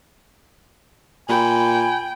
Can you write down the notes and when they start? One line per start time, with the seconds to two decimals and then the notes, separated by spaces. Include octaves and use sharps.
1.29 A#2 G5 G#5 B5